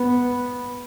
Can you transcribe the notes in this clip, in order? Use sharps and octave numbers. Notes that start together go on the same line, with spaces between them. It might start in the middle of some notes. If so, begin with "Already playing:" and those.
Already playing: B3